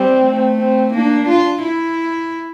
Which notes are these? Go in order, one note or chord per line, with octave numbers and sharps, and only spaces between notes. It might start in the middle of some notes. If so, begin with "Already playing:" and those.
Already playing: G3 C4
A3
C4
A#3 D4
F4
E4